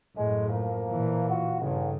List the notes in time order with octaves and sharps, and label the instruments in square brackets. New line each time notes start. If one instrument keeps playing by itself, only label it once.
[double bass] F#2 A2 [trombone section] G#3
[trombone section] F3 A#3
[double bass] A#2 E3
[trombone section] F4 F#4
[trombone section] A1 [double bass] G2 C#3